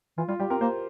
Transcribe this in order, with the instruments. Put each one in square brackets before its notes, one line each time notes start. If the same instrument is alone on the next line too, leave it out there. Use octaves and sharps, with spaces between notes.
[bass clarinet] E3 [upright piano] F4
[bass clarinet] G3 [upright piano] F4
[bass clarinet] G3 [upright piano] G4
[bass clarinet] C4 [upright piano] A#4
[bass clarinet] A#3 [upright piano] C5